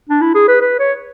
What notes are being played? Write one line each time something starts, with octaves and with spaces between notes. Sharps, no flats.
D4
E4
G#4
B4
B4
C#5